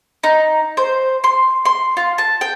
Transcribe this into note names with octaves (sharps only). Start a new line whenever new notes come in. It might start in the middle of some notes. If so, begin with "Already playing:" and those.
D#4
C5
C6
C6
F4
A5
G5